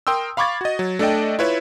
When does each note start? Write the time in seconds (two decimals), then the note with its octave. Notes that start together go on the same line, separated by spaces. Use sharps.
0.07 A#4 G5 C6 D#6 E6
0.37 F5 B5 C#6 D6 G#6 A6
0.61 F#4 D#5
0.79 F#3
0.99 A3 D4 A4 D5 D#5 G5
1.39 E4 F4 B4 C#5 E5